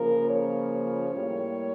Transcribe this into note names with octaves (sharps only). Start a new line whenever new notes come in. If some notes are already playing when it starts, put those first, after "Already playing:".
Already playing: C#3 F3 A#3 A#4
C#5
A2 G3 A#3